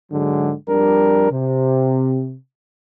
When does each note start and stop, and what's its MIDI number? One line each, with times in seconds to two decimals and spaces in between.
0.12 0.53 44
0.12 0.53 50
0.12 0.53 54
0.12 0.53 56
0.68 1.28 41
0.68 1.28 55
0.68 1.28 62
0.68 1.28 70
1.31 2.36 48